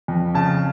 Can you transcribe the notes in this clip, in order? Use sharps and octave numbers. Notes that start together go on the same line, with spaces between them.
F2
C#3 A5